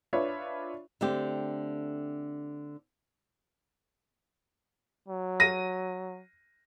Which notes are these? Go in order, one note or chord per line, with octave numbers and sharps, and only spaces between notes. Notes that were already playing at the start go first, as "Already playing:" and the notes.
D4 F4 B4 C#5 E5
D3 A3 C4 G4
F#3
A#6 D#7